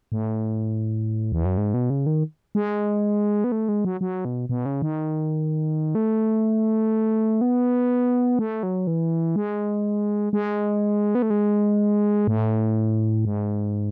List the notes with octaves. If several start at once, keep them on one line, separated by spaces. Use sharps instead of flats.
A2
E2
F#2
G#2
B2
C#3
D#3
G#3
B3
A3
G#3
F#3
F#3
B2
B2
C#3
D#3
A3
B3
A3
F#3
E3
G#3
G#3
B3
A3
G#3
A2
G#2